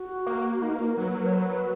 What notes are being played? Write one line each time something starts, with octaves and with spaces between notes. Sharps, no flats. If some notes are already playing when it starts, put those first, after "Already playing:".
Already playing: F#4
A#3
A#3 D#4
B4
A#4
F#3 B4
A#4
C#5
B4